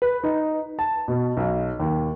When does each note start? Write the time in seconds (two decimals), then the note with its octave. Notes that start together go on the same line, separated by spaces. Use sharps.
0.02 B4
0.24 D#4
0.79 A5
1.08 B2
1.37 B1
1.79 D#2